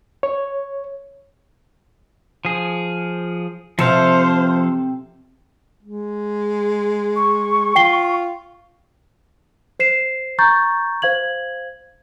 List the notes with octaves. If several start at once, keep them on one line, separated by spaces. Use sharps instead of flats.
C#5
F3 G#4
C3 F3 A4 C5 F5
G#3
C#6
F4 G5 C7 G7
C5 C7 E7
A#5 C#6 G6 A6
C5 F5 G#6 F#7